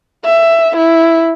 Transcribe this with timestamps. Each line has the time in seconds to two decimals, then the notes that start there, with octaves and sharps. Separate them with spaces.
0.25 E5
0.77 E4